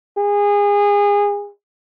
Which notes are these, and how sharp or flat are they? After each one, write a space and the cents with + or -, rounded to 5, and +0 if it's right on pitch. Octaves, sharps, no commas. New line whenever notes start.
G#4 -25